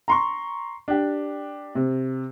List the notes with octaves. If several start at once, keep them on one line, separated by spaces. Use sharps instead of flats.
A#5 C6 C#6
D4 G4
C3